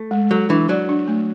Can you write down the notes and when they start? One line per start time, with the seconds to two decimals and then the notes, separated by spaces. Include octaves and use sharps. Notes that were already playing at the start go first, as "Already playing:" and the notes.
Already playing: A3
0.11 G#3
0.31 F#3 A4
0.50 E3 D4
0.69 F#3 D5
0.89 D4
1.07 A3